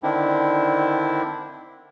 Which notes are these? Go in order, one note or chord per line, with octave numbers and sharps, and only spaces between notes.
D3 D#3 C4 D4 E4